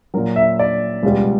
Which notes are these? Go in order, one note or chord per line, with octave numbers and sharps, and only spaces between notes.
A#2 F#3 A#4
E5
D5
C#2 B2 G3